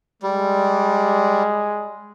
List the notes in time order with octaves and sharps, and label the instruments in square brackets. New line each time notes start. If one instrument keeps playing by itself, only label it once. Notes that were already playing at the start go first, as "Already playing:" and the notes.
[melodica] G3 [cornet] G#3